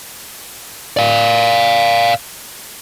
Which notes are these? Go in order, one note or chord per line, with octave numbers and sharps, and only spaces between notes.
D5 F5